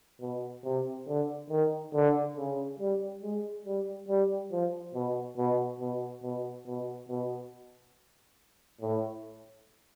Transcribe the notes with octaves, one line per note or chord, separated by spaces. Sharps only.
B2
C3
D3
D#3
D3
C#3
G3
G#3
G3
G3
F3
B2
B2
B2
B2
B2
B2
A2